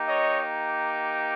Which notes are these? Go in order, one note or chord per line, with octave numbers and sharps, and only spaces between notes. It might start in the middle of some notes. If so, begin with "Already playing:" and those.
Already playing: A#3 D#4 G4
C#5 D#5